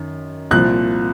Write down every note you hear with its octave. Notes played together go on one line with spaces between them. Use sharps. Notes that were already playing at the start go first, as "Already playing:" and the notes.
Already playing: F#2 D#3
C2 A#2 F3 F#6